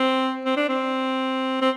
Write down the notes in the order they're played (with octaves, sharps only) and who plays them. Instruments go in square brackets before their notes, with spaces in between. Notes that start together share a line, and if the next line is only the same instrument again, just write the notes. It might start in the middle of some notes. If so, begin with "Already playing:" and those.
Already playing: [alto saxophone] C4
C4
D4
C4
C4